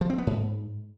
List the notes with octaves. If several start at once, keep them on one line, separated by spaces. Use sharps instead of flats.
F3
C4
B3
G#2